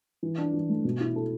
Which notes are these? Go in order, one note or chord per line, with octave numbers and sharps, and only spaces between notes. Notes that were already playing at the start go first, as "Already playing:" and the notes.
E3
D4
E3
A3
B2
E4
A4